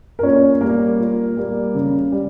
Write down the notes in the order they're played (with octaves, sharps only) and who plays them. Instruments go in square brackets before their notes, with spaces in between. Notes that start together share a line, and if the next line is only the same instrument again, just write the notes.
[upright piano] A#4
A#2 C#4 C#5
G3 A#3 A#4
A#2
G3 A#3
C#3
G3